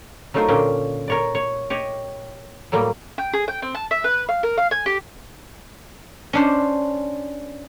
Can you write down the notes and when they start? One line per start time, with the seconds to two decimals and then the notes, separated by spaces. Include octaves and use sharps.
0.34 F#3 A3 D#4 F4 A#4 C5
0.48 A#2 D3 A#3 C#4 G5
1.08 A#4 C#5 D5
1.35 C#5
1.70 G4 C#5 D#5
2.72 A2 F#3 G3 A#3
3.18 G5
3.33 G#4
3.48 G5
3.62 C4
3.75 A5
3.91 E5
4.04 B4
4.29 F5
4.43 A#4
4.58 F5
4.71 G#5
4.86 G4
6.33 C#4 D4 C5